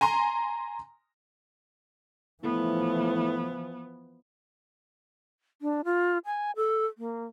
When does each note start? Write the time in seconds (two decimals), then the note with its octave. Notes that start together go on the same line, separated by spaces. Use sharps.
0.01 G#5 A#5 C6
2.43 A2 E3 F3 B3
5.62 D4
5.85 F4
6.26 G#5
6.56 A4
6.98 A#3